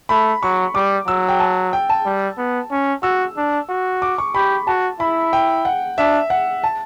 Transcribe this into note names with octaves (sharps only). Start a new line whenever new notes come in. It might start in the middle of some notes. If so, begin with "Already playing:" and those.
A3 B5
F#3 C#6
G3 D6
F#3 E6
G5
A5
G5
A5
G3
B3
C#4
F#4 E6
D4
F#4
D6
C#6
G4 B5
F#4 A5
E4 B5
G5
F#5
D4 E5
F#5
A5